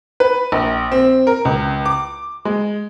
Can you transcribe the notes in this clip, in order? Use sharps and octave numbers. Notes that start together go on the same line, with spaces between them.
B4
A#1
C4
A#4
C#2
D6
G#3